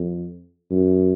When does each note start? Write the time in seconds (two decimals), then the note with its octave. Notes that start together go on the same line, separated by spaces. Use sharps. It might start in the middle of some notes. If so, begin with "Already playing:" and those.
Already playing: F2
0.71 F#2